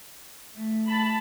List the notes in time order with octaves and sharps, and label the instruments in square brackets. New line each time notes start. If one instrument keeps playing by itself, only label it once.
[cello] A3
[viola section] A5 B5